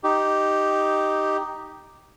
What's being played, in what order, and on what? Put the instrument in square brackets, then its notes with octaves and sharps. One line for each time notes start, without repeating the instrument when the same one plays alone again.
[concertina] D#4 G4